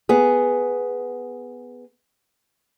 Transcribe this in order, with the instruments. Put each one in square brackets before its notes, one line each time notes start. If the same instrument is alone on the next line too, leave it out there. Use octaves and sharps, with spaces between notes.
[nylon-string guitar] B3 G#4